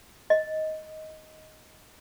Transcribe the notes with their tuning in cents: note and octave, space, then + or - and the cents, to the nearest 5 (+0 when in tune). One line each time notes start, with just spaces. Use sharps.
D#5 +10